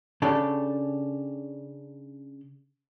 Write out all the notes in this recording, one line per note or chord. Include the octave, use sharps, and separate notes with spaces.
C#3 D4 G4 A4